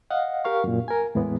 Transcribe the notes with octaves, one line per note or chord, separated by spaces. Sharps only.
D#5 F5 F#5
G4 A#4 F5 C#6
F#2 A#2
A#4 G#5
E2 A2 E3 G#3 B3